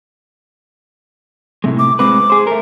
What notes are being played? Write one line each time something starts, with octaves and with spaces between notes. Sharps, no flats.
A2 C3 G#3
D6
G#3 C4 B4 D6
G#4 C5
A3 A#4